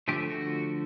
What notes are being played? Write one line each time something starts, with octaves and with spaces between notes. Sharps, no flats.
D3 F3 A3 G4
F#4